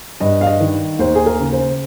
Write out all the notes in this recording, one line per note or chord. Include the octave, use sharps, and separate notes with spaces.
G2 D#5
F5
D#5
D#3
D#2 C5
G#4
A#4
C#3
C5